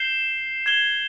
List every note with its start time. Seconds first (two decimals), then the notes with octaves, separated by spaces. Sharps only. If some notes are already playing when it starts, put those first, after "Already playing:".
Already playing: G6 C7 E7 G7
0.66 G#6 E7 G7